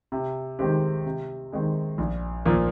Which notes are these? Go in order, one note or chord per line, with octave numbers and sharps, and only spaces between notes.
C3
D#3 G#3 C4 G4
C3
D#3 G#3 C4
A#1
A#2 F3 A#3